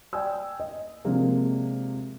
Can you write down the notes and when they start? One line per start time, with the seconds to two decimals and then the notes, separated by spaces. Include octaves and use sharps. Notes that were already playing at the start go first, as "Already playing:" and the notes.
0.13 D5 G5 G#5 E6
0.60 D#5
1.05 C3 F3 G#3 A#3 D4